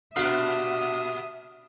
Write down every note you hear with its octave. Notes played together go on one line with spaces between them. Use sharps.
G2 A#2 D4 F#4 E5 D#6 F6 C7